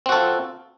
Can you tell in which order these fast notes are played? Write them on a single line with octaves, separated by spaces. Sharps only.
C4 F#4 A4 F4